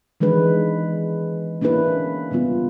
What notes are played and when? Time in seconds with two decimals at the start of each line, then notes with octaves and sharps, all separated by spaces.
0.20 D#3 E3 G#3 D4 B4
1.61 A#3 C#4 D4 E4 B4
2.31 C#3 G3 B3 F4